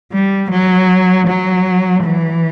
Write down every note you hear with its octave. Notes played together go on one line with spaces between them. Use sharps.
G3
F#3
F#3
E3